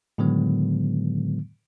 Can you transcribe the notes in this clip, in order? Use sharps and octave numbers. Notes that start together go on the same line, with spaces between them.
A2 D3 D#3 F#3 G#3 B3